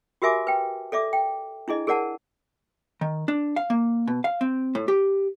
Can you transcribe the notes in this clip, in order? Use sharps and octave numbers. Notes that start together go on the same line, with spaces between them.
F#4 G4 A#4 E5 G#5 D6
B4 G5
A4 D5 E5 D6
G5
D4 E4 G#4 D#5
G#4 A#4 D5 F#5 A5
D#3
D4
F5
A#3
B2
F5
C4
A2
G4